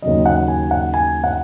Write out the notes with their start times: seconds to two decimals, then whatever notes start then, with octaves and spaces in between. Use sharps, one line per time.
0.02 D#2 C#3 F#3 D#5
0.26 F#5
0.48 G#5
0.71 F#5
0.94 G#5
1.24 F#5